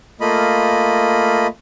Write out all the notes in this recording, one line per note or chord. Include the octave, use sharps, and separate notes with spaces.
A3 A#3 F4 D#5 B5